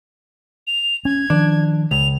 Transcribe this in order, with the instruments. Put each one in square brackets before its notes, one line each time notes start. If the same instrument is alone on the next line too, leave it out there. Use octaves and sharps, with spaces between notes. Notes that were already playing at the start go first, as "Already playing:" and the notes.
[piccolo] F7
[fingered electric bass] C#4 [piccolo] G#6
[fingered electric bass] D#3 F3 [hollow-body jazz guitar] D4
[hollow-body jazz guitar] C#2 [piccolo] F7